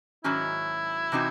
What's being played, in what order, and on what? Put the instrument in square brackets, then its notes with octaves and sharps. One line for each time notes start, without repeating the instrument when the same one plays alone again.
[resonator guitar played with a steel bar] G#2 D#3 F#3 C#4 F#4 [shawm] E4
[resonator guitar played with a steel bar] C3 E3 C4 D#4 F#4